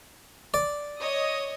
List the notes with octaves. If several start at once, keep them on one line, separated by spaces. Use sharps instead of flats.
D5
C#5 D#5 D#6